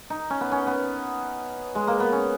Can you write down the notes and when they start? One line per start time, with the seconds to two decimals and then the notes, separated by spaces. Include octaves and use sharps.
0.10 D#4
0.30 C#4
0.41 B3
0.51 C#4
0.67 B3
1.75 G#3
1.87 A#3
2.00 B3
2.12 C#4